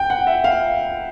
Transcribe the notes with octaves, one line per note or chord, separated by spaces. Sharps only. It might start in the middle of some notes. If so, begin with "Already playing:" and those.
Already playing: G5
F#5
E5
F5